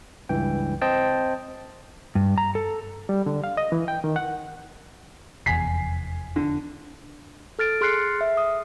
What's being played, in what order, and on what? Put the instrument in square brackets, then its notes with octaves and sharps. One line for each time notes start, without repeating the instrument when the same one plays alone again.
[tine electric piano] C#2 G2 E3 G5
C4 C5 D#5 G5 A5
[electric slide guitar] G2
A#5
A4
[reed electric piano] G3
D3
F5
D#5
E3
G5
D#3
F#5
[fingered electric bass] F1 E2 [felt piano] G#5 B6 C7
[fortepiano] D3
[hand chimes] A4 F6 A6 D7
G#4 C6 F6 F#6 C7 C#7
E5
D#6